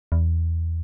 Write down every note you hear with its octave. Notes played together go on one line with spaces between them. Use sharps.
E2